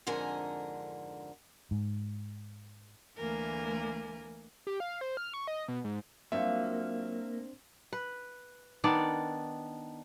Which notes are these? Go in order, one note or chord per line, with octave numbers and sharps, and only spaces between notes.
F2 G#2 D3 A#4 G#5
G#2
D2 E3 A3 A#3 A#4 G#5
G4
F5
C5
F6
C#6
D#5
B2
G#2
F#3 A#3 C4 D4 F4 C5 E5
B4
D#3 B3 D4 D5